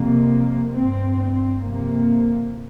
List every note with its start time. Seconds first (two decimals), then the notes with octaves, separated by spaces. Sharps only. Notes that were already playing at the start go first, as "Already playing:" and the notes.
Already playing: F2 C3 A#3
0.75 G2 C4
1.20 C4
1.63 F2 C3 A#3